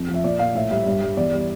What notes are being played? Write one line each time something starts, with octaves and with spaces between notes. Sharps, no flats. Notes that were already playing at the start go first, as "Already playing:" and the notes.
Already playing: F2
F3
E5
A#2 D5
A#2 F5
A2 E5
G3 E5
G2
G3
E2 D5
G3